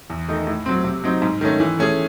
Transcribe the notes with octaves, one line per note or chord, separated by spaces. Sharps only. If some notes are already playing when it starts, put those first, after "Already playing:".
E2
D#3 A3 D#4
A2
F#3 C4
C3
F#3 C4 D#4
G#2
D#3 A3 C#4
E3
A3 C#4 G#4